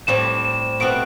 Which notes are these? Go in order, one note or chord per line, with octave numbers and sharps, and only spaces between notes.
A2 G3 C4 E7
E7
B2 A3 C4 F#4 D7